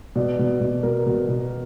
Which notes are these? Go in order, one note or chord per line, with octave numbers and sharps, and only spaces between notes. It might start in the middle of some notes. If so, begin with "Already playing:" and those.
B2 D5
B2
B2
B2 A#4
B2
B2